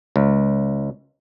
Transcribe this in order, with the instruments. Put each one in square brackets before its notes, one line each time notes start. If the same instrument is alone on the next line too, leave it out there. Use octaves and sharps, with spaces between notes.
[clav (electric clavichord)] C#2